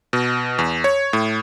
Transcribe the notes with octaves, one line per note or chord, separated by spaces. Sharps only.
B2
E2
C#5
A2